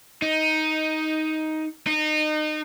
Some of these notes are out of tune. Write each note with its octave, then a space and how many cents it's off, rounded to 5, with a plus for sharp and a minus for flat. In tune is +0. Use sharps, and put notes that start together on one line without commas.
D#4 +10
D#4 -25